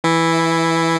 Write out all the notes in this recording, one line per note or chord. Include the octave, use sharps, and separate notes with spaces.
E3 E4